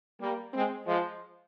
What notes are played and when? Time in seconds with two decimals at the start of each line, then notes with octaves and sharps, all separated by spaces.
0.21 G3 A#3
0.53 G#3 C4
0.86 F3 G#3